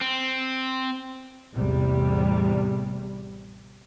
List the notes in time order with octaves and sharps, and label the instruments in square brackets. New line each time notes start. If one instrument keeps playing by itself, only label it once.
[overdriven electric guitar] C4
[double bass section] A1 E2 C3 G3